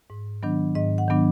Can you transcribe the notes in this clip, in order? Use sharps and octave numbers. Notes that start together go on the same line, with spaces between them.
G#2
D#3 F#3 B3 D4
G#2 D#5
F#5
D#3 F#3 B3 D4